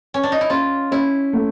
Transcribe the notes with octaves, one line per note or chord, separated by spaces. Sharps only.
C#4
D4
D#4
E4
C#4 F4
C#4 E4
A3